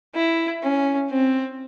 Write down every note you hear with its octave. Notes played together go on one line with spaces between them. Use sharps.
E4
C#4
C4